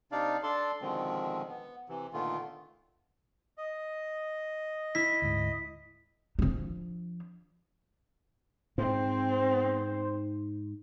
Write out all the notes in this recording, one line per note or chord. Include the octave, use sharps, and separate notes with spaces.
C3 D4 D#4 D5 F5
D4 A4 D5 A5 C6
B2 D3 D#3 F3 G#3 C4
B3
C3 E3
A#2 D3 D#3 A3 B3 F4
D#5
E4 B6
D2 G#2
F3 D4
G#2 C4 C5